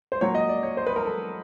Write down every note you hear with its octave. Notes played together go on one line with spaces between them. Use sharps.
C5
A#2 F#3 C#5
D#5
D5
C#5
C5
B4
A#4
A4